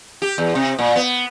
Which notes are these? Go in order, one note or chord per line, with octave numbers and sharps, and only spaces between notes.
G4
E2
C3
A#2
B3